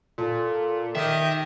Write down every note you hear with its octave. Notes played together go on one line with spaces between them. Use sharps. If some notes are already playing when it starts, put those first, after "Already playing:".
A#2 A4
D#3 G4 D#5 E5